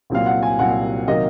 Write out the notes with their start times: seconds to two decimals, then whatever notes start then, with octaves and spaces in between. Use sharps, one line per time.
0.10 C2 A#2 F#3 C4 F5
0.26 F#5
0.43 G#5
0.59 C2 A#2 F#3 C4 F#5
1.08 C3 D#3 F#3 A#3 D#5